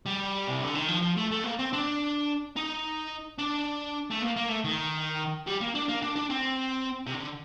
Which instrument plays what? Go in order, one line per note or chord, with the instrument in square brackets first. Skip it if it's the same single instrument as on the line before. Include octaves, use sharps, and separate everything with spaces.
[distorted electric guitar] G3
C3
D3
D#3
F3
F3
A3
A3
A#3
C4
D4
D#4
D4
A3
A#3
A#3
A3
D#3
G3
A#3
D4
A#3
D4
D4
C4
C3
D3